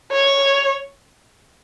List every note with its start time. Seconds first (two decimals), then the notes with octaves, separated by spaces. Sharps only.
0.12 C#5